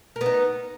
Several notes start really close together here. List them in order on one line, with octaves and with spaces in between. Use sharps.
A#4 B3 D#4